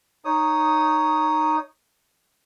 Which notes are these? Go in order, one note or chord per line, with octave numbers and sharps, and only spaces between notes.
D#4 C#5 D#6